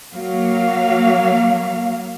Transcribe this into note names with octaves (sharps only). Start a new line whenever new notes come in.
F#3 A#3 F5